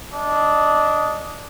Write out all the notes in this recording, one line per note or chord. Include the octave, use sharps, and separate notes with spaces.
D4 D#5